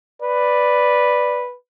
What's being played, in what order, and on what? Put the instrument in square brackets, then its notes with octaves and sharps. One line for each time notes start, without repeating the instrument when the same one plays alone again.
[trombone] B4 [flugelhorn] D5